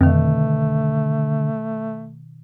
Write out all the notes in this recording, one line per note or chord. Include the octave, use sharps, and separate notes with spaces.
F2 B2 D3 D#3 A3